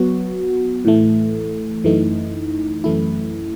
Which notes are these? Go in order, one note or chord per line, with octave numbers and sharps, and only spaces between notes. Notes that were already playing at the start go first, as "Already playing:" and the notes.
Already playing: F#3 B3 F#4
A2 E3 A3
F#2 E3 A3 D#4
F#2 E3 A3 E4